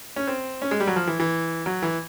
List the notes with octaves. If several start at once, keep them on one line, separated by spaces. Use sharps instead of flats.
C#4
C4
C#4
G#3
G3
F#3
F3
E3
E3
F#3
E3